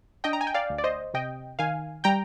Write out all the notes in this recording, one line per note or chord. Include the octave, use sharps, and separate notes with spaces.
D4 D#5 G5
A#5
G#5
G5
D5 F5
D2
D5
C5 D#5
C3 D#5 G5
D#3 F5 G#5
G3 G5 A#5